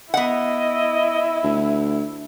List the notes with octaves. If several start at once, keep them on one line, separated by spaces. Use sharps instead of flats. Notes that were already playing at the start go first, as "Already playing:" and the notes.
B3 E4 D#5 F#5
D2